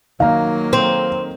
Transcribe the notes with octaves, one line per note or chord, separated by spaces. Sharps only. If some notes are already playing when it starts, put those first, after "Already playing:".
D#3 F#3 A#3 F5 A#5
C4